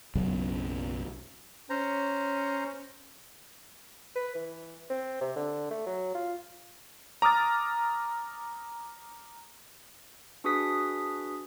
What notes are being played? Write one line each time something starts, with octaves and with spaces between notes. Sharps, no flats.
B1 F#2 C#3
C#4 C5 A#5
B4
E3
C4
C3
D3
A3
F#3
F4
A#5 D6 D#6 F6 A6
D4 F#4 G#4 B4 D#6 B6